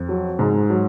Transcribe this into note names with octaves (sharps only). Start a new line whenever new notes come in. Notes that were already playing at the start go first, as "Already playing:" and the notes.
Already playing: F2
F#3
G#2
F#3